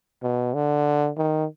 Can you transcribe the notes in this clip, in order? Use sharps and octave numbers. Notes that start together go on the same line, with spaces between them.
B2
D3
D#3